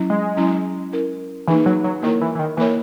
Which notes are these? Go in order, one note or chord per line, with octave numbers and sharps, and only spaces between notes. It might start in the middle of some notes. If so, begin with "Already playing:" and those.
Already playing: F#3 C#4 E4
G#3
F#3 C#4 E4
C#4 E4 A#4
E3 A#3 D#4 G#4 B4
F#3
F#3
D#3 A#3 E4 A#4 C#5
E3
E3
D#3
E3 A#3 E4 A#4 C#5